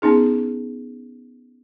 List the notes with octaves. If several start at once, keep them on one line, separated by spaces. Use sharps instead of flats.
B3 C#4 D#4 G#4